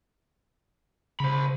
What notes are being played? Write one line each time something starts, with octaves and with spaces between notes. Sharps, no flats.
C#3 C5 B5